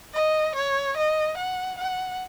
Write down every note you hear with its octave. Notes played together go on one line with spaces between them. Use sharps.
D#5
C#5
D#5
F#5
F#5